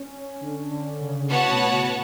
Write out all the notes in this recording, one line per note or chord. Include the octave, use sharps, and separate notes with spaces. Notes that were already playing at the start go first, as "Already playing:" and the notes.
Already playing: C#4
D3
D3
C#3
A2 B3 F#4 C#5 F#5 A5
B2
C#3